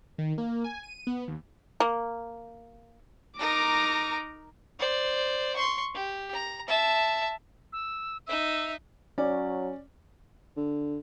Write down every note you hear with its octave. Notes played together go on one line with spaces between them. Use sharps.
D#3
A#3
G#5
D#7
B3
D#2
A#3
D#4 A#4 A#5 D6
C5 D5
C6 C#6
G4
A#5
E5 A5
E6
D#4 E5 E6
F#3 C#4 D5
D3